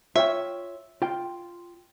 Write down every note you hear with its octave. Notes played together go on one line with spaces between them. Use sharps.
F4 C#5 E5 G5
F4 G5